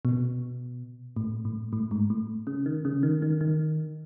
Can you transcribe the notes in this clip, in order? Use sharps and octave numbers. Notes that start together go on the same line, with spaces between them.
B2
A2
A2
A2
G#2
A2
C#3
D#3
C#3
D#3
D#3
D#3